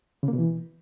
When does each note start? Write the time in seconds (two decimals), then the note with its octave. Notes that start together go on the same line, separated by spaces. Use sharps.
0.23 C#3
0.28 A#3
0.33 B2
0.38 E3